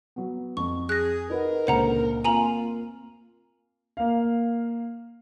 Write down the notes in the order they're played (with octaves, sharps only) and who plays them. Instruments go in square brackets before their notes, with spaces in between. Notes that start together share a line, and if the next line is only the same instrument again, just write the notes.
[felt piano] F#3 B3
[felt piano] F2 [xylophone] C#6
[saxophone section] G#4 [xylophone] F#6 A#6
[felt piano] D#4 B4 F#5 [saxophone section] A#4
[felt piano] C#2 A#2 D3 [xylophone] C5 F#5 A#5
[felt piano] A#3 C4 [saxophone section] F4 [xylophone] G#5 A#5 F#7
[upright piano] A#3 F5